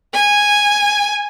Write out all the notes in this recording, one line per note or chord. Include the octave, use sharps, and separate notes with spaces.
G#5